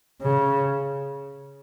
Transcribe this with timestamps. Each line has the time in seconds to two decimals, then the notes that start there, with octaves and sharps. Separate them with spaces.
0.22 C#3